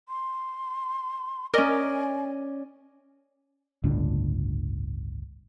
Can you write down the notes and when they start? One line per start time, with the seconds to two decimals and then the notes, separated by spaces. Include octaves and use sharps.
0.08 C6
1.54 C#4 A#4 D5 D#5 G#5
3.84 G1 C#2 A2 D3